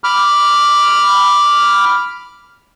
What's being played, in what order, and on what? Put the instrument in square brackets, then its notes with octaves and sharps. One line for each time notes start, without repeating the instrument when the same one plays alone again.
[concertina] B5 D6 F6